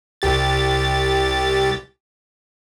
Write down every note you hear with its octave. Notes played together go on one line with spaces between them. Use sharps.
C2 G4 A6